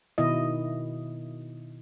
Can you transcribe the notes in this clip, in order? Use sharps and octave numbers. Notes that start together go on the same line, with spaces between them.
B2 D#3 E4 D#5